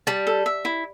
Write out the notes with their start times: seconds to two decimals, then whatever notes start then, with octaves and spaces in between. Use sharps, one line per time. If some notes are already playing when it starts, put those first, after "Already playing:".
0.07 G3 A5
0.27 A4
0.46 E5
0.65 E4